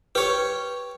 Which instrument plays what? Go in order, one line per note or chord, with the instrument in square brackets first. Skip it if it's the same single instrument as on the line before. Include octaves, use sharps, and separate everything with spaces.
[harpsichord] G4 C#5 [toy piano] B4